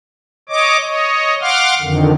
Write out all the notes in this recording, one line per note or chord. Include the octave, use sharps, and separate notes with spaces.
C#5 D#5 D6
C#5 D#5
F5 F#5 C6 D6 F6
F2 D3 D#3